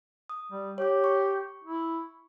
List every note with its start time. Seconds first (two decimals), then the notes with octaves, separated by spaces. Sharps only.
0.30 D#6
0.52 G3
0.78 G4 C#5 D6
1.04 C#6
1.64 E4